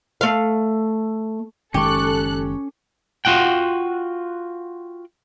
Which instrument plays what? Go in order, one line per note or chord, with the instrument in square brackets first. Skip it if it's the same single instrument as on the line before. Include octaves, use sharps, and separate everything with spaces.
[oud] A3 F5
[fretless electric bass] F#1 D#3 G#3 [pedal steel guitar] C#4 C#6 [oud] G4 [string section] A4 F#6
[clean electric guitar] F4 F#4 F#5 G5